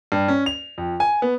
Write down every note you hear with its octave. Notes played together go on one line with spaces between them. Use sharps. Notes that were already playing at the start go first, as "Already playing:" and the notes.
G2
C#4
F7
F2
G#5
B3